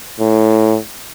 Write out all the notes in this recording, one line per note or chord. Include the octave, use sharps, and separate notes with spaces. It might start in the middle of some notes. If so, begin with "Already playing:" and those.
A2